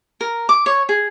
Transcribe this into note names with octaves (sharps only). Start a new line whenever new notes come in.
A#4
D6
C#5
G#4